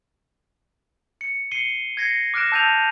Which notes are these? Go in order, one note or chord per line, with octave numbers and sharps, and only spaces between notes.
C#7
C7 C#7 D#7 G7
G#6 A#6 C7 C#7
D6 F6 F#6 A#6 D7 E7
A5 E6 G6 A6 D#7 F7